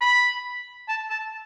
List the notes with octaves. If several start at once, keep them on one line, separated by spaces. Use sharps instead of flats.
B5
A5
A5